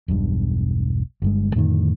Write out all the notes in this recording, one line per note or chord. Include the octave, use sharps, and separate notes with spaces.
E1 B1 G2
G1 G2 G#3
F2 A2 D3 D#3